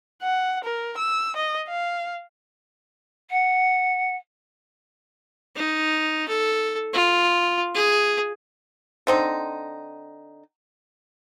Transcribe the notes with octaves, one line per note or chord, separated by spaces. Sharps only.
F#5
A#4
E6
D#5
F5
F#5
D#4
A4
F4
G#4
D3 C4 D#4